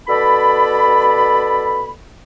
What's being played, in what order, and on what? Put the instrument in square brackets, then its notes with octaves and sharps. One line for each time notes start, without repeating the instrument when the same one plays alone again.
[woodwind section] B2 A4 D5 B5